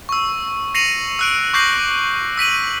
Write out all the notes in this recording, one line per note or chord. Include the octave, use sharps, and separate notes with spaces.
C#6 E6
A#6 C7 C#7 D#7 F7 F#7
E6 F#6 D7
C#6 D6 G6 A#6 C7 F#7
E6 B6 D#7 F#7